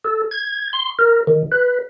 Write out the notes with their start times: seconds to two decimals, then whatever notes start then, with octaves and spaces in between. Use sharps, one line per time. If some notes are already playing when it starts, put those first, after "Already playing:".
0.05 A4
0.31 G#6
0.73 C6
0.99 A#4
1.27 D#3
1.52 B4